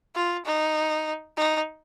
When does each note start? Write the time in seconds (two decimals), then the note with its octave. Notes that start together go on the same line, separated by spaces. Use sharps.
0.15 F4
0.45 D#4
1.37 D#4